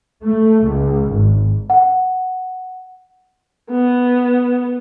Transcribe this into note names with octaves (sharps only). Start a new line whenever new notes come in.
A3
C#2
G#1
F#5
B3